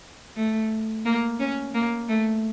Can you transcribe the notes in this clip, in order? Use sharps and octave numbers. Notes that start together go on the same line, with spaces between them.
A3
A#3
C#4
A#3
A3